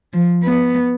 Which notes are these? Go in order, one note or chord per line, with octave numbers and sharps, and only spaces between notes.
F3
B3